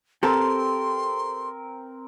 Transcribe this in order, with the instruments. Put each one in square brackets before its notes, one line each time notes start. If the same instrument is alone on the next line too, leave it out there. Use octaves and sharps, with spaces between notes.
[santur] C4 A#4 [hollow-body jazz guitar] G4 A4 [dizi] C6